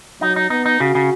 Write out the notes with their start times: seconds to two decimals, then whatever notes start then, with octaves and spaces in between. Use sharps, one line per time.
0.21 F#3 D#4
0.36 D#4
0.50 B3 D#4
0.66 D#4
0.80 C#3 F#4
0.95 C#3